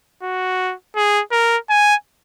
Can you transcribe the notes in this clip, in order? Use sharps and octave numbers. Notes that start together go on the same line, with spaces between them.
F#4
G#4
A#4
G#5